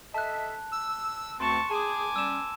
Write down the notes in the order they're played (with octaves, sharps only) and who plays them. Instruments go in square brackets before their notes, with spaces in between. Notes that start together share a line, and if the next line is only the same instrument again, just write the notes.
[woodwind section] A4 D#5 E5 [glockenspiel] A5 F#6
[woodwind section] E6
[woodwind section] D2 C4 [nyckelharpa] A5 C#6 [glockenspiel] C6 E7
[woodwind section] G#4 [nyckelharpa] G#5 D6 [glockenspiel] A5
[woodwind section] G3 C#4 [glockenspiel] E6 E7